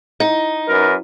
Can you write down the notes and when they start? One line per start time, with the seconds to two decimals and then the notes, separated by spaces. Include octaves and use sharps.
0.20 D#4
0.68 F#2 A#4 B4